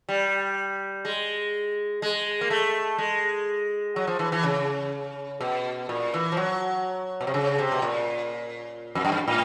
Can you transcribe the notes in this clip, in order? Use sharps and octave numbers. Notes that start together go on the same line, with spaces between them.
G3
G#3
G#3
A#3
A3
G#3
F#3
F3
E3
E3
C#3
B2
A#2
E3
F3
F#3
B2
C3
C#3
C3
B2
A#2
F2
F#2
G2
A2